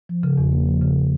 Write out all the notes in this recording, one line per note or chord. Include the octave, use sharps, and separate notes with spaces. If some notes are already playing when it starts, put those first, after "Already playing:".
F3
C#3
E2
A#3
F3
C#3